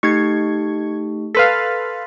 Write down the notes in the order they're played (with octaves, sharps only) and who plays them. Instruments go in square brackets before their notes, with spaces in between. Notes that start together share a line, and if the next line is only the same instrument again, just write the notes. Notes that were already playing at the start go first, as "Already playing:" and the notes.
[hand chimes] A3 D#4 G4 [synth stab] C#6 G#6
[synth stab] A4 B4 F5 [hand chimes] C6 A6 B6